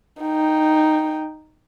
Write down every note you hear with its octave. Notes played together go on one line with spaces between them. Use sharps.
D#4 G5